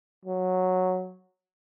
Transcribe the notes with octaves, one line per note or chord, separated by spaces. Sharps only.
F#3